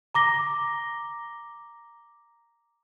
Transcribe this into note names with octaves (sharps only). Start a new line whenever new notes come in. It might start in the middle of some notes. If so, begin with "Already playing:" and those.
A#5 D6 A#6 G7